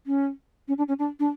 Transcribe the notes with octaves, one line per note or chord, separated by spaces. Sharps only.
C#4
C#4
D4
C#4
D4
D4